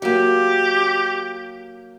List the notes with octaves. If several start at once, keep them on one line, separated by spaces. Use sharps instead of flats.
F#3 A#3 G4